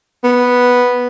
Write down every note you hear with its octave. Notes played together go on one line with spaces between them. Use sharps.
B3